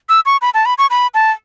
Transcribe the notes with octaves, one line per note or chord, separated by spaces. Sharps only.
E6
C#6
B5
A5
B5
C#6
B5
A5